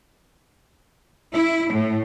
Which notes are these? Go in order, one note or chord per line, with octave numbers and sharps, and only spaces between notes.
E4
A2